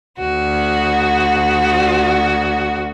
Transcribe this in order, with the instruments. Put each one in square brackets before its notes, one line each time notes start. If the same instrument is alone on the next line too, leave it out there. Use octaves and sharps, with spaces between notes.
[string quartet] D2 F#4